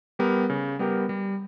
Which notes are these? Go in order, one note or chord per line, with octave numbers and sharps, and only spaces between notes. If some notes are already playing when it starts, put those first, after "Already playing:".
G3 B3 G4 A#4
C#3
G3 B3 G4 A#4
G3